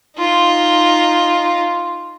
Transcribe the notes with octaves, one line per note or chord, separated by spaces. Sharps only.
D#4 F4